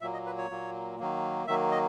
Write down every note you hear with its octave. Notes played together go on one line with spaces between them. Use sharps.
A#2 F#3 A#3 E5
D#5
B4
C#5
A#2 F#3 A#3
D#3 F#3 A#3
D#3 F#3 A#3 E5
D#5